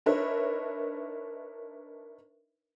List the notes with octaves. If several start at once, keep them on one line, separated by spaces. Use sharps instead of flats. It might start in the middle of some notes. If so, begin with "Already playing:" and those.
D4 D#4 A#4 B4 C#5 E5